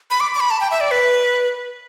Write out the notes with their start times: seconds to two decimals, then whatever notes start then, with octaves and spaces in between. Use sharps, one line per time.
0.11 B5
0.20 D6
0.35 D6
0.40 B5
0.51 A5
0.61 G5
0.71 E5
0.81 D5
0.91 B4